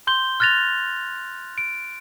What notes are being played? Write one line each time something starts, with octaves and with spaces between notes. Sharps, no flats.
C6 G6 G7
F6 F#6 A6 A#6 F7
D7